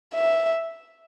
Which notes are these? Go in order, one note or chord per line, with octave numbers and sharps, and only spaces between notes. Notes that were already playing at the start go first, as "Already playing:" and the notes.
E5